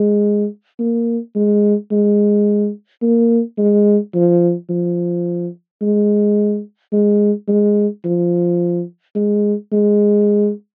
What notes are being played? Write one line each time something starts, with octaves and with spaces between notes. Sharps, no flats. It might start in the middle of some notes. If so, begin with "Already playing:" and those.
Already playing: G#3
A#3
G#3
G#3
A#3
G#3
F3
F3
G#3
G#3
G#3
F3
G#3
G#3